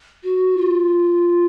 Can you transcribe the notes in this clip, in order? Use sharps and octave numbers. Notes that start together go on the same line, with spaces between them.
F#4
F4